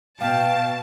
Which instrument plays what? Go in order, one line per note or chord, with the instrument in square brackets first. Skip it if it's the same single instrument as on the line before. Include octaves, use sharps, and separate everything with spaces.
[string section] B2 A5 [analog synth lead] F5 [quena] G5